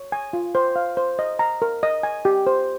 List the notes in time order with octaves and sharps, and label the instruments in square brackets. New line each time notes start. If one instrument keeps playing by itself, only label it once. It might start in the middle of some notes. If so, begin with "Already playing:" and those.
Already playing: [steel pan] C#5
G#5
F4
C5
F5
C5
D#5
A#5
A#4
D#5
G#5
G4
C5